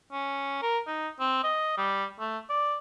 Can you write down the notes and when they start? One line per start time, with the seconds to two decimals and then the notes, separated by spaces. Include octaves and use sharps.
0.12 C#4
0.63 A#4
0.87 D#4
1.20 C4
1.44 D#5
1.78 G3
2.20 A3
2.50 D5